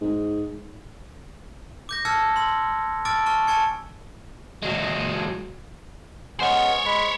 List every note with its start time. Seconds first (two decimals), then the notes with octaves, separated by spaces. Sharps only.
0.01 G#2
1.89 D6 G6 A#6
2.05 A5 E6 F6 G#6 C#7
2.36 C6 E6
3.05 A5 D6 E6 F6 A6 D7
3.26 A5 C#6 F6
3.47 G#5 A5 C#6 G#6 C#7
4.63 F#3 G#3
6.40 G#3 B3 C#4 C5 C#5
6.85 G#3 B5